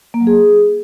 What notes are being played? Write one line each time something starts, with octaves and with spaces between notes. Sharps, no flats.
A#3
F#3
G#4